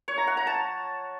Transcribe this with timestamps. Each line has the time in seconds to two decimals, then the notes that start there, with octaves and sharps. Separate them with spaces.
0.08 C#5
0.18 A#5
0.27 F#5
0.37 A#5
0.47 A5